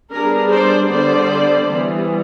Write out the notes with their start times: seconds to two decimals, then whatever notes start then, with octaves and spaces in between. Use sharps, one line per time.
0.12 G3 B3 D4 G#4 A#4
0.52 C5 D5
0.91 D3 G3 B3 C5 D5
1.69 E3 G3 B3